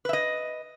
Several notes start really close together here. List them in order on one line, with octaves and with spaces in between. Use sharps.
B4 E5 D#5